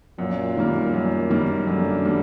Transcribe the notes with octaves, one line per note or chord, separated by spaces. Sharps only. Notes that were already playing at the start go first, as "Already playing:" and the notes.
F#2 A#2
D#3 G3 A#3
F#2
D#3 G3 A#3
F#2 D3
D#3 G3 A#3